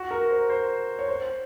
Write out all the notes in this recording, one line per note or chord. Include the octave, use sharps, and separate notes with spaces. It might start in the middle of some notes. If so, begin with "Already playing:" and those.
Already playing: F#4
A#4
C5
C5
C#5
C5